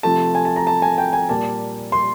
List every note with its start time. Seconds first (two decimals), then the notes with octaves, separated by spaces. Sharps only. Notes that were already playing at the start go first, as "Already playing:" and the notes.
0.03 C3 F3 A3 A5
0.35 G#5
0.45 A5
0.56 A#5
0.67 A5
0.82 G#5
0.98 G5
1.13 G#5
1.29 A#2 G3 A#3 A5
1.92 C6